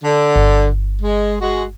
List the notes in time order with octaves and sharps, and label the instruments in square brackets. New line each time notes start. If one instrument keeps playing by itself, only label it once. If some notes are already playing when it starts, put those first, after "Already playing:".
[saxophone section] D3
[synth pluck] G1
[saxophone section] G#3
G#3 F#4